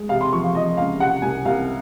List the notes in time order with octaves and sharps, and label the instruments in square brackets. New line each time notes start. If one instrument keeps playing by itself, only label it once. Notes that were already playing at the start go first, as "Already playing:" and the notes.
Already playing: [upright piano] G#3
C3 F5
C6
F3 C#6
F5
F3 D#5
C#2 F5
C3 F#5
C2 G#5
C2 F5